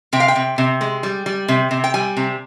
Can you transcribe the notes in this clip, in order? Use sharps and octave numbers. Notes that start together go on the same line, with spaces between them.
C3 G5
F5
G5
C3
C3
G#3
G3
G3
C3
C3
G5
G3 G#5
C3